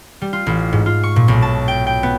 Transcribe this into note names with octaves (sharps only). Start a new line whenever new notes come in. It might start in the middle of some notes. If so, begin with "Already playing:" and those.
G3
F4
A1
G#2
F4
C#6
A#2
B1
A5
G5
G5
B3